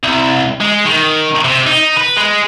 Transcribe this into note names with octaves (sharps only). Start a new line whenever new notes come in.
C2
G#3
D#3
C3
D#4
B4
G#3